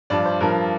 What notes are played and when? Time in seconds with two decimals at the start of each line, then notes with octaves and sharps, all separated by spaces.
0.10 G2 F3 D5
0.25 C5
0.40 G2 F3 A#4